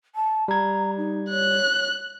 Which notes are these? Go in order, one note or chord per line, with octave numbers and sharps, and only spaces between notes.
A5
G3 A#5 G#6
D#4
C#5 F#6